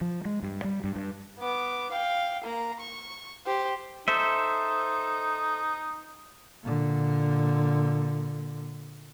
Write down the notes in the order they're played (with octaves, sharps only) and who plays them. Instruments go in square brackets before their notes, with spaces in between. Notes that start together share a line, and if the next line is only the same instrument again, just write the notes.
[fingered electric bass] F3
G#3
G2
G3
G2
G2
[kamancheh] B3 D6
F5 G5
A#3 A#5
C#6
G4 C5
[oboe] D#4 [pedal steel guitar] A4 C5 E5
[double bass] A#2 D3